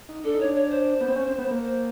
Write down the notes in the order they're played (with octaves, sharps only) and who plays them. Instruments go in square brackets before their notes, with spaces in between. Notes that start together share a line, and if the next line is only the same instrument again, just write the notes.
[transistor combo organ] D#4
[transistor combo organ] D4 [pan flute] A4
[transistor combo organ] D#4
[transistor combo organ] D4 [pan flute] C#5
[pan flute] C#5
C5
[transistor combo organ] B3
C4
C#4
C4
B3
A#3
[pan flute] C5